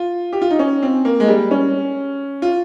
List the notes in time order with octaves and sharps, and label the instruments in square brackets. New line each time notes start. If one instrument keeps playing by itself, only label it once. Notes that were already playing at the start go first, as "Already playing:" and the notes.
Already playing: [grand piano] F4
G4
F4
D#4
C#4
C4
A#3
G#3
G3
C#4
F4